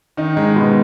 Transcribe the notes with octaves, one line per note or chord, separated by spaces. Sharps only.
D#3 D#4
G#2 G#3
B2 B3